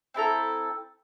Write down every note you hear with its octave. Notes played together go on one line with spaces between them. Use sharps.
C4 E4 A4 A#5